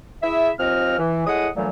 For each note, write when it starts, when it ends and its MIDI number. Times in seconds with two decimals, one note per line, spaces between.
0.23 0.51 64
0.23 0.51 68
0.23 0.51 76
0.59 0.97 39
0.59 0.97 53
0.59 0.97 60
0.59 0.97 75
0.59 0.97 89
0.98 1.26 52
1.27 1.49 45
1.27 1.49 56
1.27 1.49 64
1.27 1.49 78
1.27 1.49 87
1.56 1.69 46
1.56 1.69 50
1.56 1.69 52
1.56 1.69 54
1.56 1.69 55
1.56 1.69 57